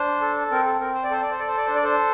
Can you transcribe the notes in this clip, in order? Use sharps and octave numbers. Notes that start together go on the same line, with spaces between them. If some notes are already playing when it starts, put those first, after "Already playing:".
Already playing: D4 C5
A4
C4 A#4
A4
C4 A#4
C5
D5
A4 C5
D5
C5
A4 D5
C5
D5
D4 C5
D5
A4 C5